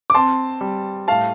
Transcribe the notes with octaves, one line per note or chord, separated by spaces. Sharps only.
D6
C4 A5 C6
G3
A2 F5 A5